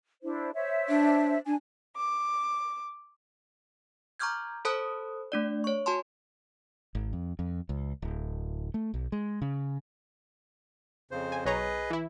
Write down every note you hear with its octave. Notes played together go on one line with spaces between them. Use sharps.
D4 E4 C5
C5 C#5 E5
D4
D4 G#5
D6
A#5 C#6 D6 F6 G6 G#6
A4 C5 A5 B5 D#6 F#6
A3 D4 D5
C#5 C#6
F#4 G#5 A5 C6
G#1
F2
F2
C#2
D1
A3
B1
G#3
C#3
F2 C#3 C5
G#5
B1 G#4 B4 C#5 D#5 A#5
E3 E4